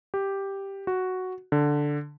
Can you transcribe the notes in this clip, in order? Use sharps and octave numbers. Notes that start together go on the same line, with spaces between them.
G4
F#4
D3